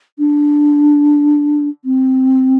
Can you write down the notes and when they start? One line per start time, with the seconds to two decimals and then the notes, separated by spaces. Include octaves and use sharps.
0.19 D4
1.85 C4